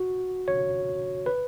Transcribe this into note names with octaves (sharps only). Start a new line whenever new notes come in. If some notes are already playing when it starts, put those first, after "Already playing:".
Already playing: F#4
C#5
B4